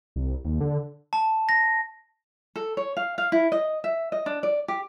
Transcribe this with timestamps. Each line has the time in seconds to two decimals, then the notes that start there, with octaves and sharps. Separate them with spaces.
0.16 C2
0.45 D#2
0.61 D3
1.13 A5
1.49 A#6
2.56 A4
2.77 C#5
2.97 F5
3.18 F5
3.32 E4
3.52 D#5
3.84 E5
4.12 D#5
4.26 D4
4.43 D5
4.68 G4